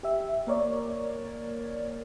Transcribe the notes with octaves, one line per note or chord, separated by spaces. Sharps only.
G4 E5
A#3 A#4 C#5 D5